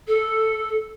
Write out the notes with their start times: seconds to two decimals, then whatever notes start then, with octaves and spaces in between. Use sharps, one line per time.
0.07 A4